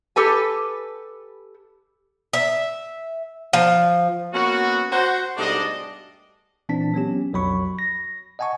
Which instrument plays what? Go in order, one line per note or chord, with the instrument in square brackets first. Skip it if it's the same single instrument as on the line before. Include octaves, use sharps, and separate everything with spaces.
[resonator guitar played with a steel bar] G4 A4 B4 G#5
[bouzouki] E5
F3
[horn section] A#3 B3 C#4 F#4
F#4 C5
G#2 B2 G3 A3 D4 D#5
[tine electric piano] A#2 E3 C4 D4 A5 B6
F#3 B3 C#4 G4
B1 F2 F#3 B5 C#6
A#6
D#5 F#5 G#5 A5 C#6